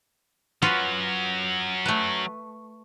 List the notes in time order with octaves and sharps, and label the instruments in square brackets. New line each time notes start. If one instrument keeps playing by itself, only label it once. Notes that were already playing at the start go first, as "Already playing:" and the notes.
[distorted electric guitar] F#3 C#4 [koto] F4 F#4 B4
[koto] A3 B4